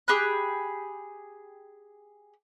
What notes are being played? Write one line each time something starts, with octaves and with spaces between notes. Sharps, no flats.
G4 G#4 B5 F#6